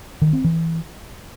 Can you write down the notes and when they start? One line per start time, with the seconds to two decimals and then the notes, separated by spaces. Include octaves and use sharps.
0.22 D#3
0.33 C4
0.44 E3